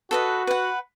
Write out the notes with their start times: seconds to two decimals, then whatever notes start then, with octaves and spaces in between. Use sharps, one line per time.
0.11 F#4 A4 B4 D#5
0.47 B4 F#5